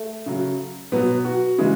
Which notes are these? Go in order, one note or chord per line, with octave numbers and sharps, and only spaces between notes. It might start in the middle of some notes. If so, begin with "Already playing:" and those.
Already playing: A3
C#3 F#3
B2 F#3 B3
F#4
C#3 E3 G#3